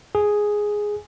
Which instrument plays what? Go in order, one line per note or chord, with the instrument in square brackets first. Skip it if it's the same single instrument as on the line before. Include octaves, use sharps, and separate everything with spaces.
[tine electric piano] G#4